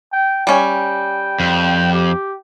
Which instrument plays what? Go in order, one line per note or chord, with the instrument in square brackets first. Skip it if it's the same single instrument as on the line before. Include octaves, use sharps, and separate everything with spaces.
[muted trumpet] G5
[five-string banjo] G3 C#4 G#5 [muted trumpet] G5
[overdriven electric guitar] F2
[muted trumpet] G4